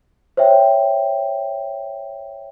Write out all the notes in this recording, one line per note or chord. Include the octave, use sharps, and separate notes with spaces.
C5 C#5 E5 G5